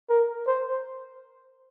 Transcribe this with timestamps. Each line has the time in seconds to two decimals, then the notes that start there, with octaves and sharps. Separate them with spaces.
0.09 A#4
0.47 C5